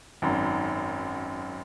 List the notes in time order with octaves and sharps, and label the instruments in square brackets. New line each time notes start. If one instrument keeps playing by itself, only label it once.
[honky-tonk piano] G#1 F#2